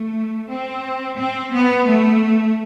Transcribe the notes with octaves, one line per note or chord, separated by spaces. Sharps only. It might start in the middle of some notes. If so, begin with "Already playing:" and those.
Already playing: A3
C4
C4
B3
A3